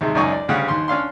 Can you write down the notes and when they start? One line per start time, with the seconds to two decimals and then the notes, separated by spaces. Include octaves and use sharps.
0.01 D#2 C3 G#3
0.15 C#2 F#2 D#4 D5 G#5 C#6
0.32 D5
0.48 D2 C#3 G3 F#5
0.68 D#2 C6
0.88 C#4 D4 F5 C6